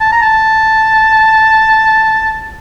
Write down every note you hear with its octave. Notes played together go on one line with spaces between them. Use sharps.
A5
A#5
A5